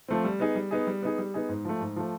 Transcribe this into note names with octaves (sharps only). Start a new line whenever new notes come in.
F3 A3 C4
G3
B3 D#4 G#4
G3
B3 D#4 G#4
G3
B3 D#4 G#4
G3
B3 D#4 G#4
G#2
F3 A3
G#2
F3 A3